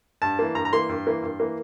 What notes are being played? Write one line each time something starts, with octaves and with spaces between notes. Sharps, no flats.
G2 A5
E3 A#3
G2 A#5
A#5
E3 A#3 C6
G2
E3 A#3
G2
E3 A#3